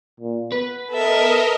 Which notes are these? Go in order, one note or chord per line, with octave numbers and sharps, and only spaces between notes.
A#2
B3 B4
A4 A#4 D#5 E5